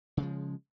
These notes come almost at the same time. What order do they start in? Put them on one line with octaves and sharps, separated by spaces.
C#3 G#3 F3